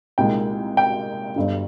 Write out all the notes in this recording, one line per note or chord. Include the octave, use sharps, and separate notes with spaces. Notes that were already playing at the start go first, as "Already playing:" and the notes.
C2 A#2 G#3 D#4 G5
G5
G1 G2 D3